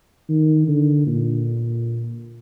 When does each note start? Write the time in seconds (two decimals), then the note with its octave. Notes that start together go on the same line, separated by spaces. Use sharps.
0.29 D#3
0.67 D3
1.07 A#2